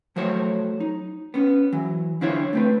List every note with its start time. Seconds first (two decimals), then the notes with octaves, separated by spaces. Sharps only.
0.16 F3 F#3 A3 C5 C#5
0.80 D#4
1.34 B3 C#4
1.73 E3 F#3
2.21 D3 D4 E4 F4 C5 C#5
2.53 A3 C4 B4